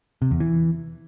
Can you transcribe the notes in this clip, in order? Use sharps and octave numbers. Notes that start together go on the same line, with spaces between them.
C3
E2
E3